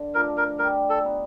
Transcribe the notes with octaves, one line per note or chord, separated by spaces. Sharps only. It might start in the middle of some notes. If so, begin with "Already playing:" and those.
Already playing: D3
F3 A3 D4 A#4
A#4
G3 A#4
A4
B3 D#4